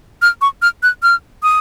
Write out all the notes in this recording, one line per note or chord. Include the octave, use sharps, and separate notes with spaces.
F6
C#6
F6
F#6
F6
D#6